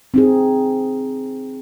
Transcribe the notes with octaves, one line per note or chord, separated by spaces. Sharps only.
C4 D#4 G#4